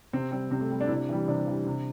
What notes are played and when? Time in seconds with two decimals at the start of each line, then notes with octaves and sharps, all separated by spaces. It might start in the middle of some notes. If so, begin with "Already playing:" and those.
0.13 C3 C4
0.32 G3 C4
0.51 C3 C4
0.61 A3
0.71 G3
0.80 D4
0.87 C3 E4
0.96 D4
1.09 E3 G3
1.28 C3 D4
1.47 E3 G3
1.66 C3